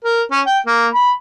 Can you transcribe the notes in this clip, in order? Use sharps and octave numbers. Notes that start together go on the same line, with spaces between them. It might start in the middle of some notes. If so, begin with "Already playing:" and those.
A#4
C#4
G5
A#3
B5